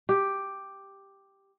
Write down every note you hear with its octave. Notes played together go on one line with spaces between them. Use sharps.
G4